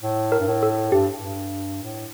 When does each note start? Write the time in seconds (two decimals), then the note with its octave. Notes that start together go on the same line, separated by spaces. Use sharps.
0.02 A2
0.32 A#4
0.40 G2
0.47 A2
0.63 A4
0.92 G2 G4
1.19 G2
1.82 A2